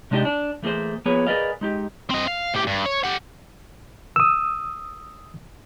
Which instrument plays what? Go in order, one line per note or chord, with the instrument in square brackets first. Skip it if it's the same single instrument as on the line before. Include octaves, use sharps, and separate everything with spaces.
[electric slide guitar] C3 G#3 D4 D#4 G4 D#5
D4
E3 A3 A#3 G#4 C5
F3 A#3 B3 G#4 B4 C#5
G#4 A#4 B4 D5 D#5 F5
G#3 D#4 G4
[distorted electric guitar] C4 D#5
F5
A2 G4
G2
C#5
G4 F#5
[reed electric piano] D#6 E6